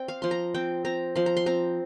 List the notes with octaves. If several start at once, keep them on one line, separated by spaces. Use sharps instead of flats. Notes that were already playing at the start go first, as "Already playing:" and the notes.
Already playing: C4 D5 G5
F5
F3 C6
A#5
C4 G5
C4 A#5
F3 C6
A#5
C6
C4 A#5